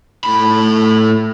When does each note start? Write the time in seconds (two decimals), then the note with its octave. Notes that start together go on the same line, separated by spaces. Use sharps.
0.24 A2 B5